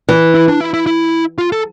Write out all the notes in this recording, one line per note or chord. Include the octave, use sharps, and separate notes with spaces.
E3
E4
D4
E4
E4
E4
F4
A4